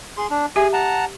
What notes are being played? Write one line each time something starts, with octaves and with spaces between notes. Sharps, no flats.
G#4 C6
D4
G4 G#4 E5 G#5
F#5 A5 A#5